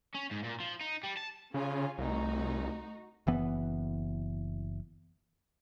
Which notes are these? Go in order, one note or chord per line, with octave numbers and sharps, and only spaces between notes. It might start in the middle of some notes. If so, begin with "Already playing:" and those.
C#4
G#2
A#2
F3
D#4
G3
A5
C#3 C#4 F4 G#5
C2 A3 D#4 F#4
F#1 E3 B3